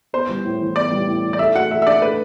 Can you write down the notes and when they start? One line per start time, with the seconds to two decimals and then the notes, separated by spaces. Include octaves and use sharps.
0.13 B3 C5
0.29 G3
0.45 A2
0.60 E3
0.76 B3 D5
0.91 G3
1.07 A2
1.24 E3
1.33 D5
1.39 A3 E5
1.55 F#4 F#5
1.70 A3 E5
1.82 E5
1.87 D4 D5
2.02 A3 B4